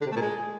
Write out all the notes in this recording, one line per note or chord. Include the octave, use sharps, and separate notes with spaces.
D3
C3
A3
A#2
G#3